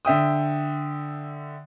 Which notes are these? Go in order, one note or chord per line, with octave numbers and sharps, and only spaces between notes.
D3 E5 G5 D#6